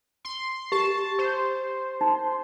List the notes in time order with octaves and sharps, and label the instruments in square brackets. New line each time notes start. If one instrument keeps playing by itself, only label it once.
[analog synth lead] C6
[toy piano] G4 [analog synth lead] A5
[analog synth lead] C5
[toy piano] D#4